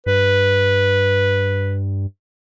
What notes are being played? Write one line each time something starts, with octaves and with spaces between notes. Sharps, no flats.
G2 B4